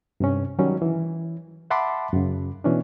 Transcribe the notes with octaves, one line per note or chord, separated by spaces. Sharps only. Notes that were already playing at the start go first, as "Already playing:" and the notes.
G2 C3 C#4
D#3 F#3 G3 C#4
E3
E5 F#5 A5 B5 C6 D6
F#2 C#3
B2 E3 C#4 D4